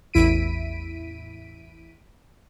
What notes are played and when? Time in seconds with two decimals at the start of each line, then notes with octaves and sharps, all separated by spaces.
0.14 A1 E2 E4 B6 D7 D#7